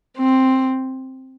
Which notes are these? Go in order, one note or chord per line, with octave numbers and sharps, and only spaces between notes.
C4